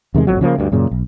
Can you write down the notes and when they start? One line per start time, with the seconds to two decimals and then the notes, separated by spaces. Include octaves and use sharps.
0.14 E2 C3 D#3 G#3
0.27 D1 G1 F2 F#3
0.41 C#3 F3 G#3 A#3
0.58 D2 G2
0.72 F#2 A#2 C#3
0.91 B1